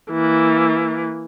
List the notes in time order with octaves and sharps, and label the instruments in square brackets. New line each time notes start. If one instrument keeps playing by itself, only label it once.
[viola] E3 A#3